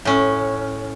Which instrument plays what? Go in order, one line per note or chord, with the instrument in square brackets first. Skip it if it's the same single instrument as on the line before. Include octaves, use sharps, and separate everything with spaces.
[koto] A2 C#4